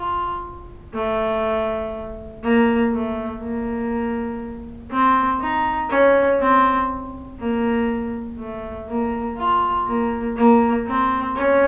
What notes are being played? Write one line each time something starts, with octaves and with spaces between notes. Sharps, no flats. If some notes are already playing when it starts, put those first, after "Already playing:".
Already playing: F4
A3
A#3
A3
A#3
C4
D#4
C#4
C4
A#3
A3
A#3
F4
A#3
A#3
C4
C#4